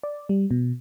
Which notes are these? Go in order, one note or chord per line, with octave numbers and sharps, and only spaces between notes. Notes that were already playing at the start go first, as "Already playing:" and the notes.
D5
G3
B2